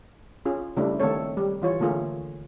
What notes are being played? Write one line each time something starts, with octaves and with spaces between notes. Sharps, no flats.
C#4 F4 G#4
C#3 G3 A3 D4 E4
D#3 A3 C4 A4 C#5
G3
E3 F4 C#5
D3 A3 A#3 F4 G#4